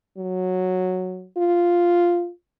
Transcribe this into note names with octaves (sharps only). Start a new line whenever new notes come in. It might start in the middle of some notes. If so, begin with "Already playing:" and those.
F#3
F4